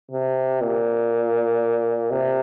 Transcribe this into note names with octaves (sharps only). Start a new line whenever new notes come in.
C3
A#2
C3